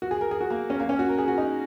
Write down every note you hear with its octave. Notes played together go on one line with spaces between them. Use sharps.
F#4
G#4
A#4
G#4
F#4
A#3
C#4
A#3
C#4
F#4
A#4
G#4
F#4
D#4